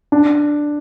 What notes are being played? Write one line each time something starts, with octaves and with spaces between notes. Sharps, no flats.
D4